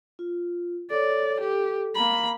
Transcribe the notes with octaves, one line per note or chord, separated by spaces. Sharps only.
F4
A4 C#5 D5
G4 A4
A#3 A#5 B5